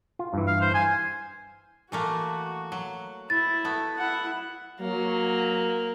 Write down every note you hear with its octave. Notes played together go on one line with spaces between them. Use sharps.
F4
G2 E3
F5
C5
G#5
E3 A3 A#3 F#4
F#3
E4 A6
A3 B3
E4 F#5
F#3 A#3